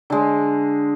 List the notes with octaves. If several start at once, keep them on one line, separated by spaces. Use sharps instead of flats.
D3 G#3